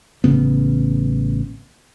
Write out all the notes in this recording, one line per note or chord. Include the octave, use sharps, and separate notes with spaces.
A1 C#3 B3